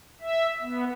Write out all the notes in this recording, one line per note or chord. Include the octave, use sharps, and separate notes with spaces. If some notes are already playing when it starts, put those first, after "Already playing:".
E5
B3